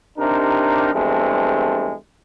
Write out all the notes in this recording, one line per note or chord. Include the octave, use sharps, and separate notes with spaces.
C3 D4 D#4 G4 A#4
E2 G2 G#3 A3 C4